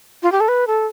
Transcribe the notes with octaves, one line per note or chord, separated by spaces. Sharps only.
F4
G4
A4
B4
A4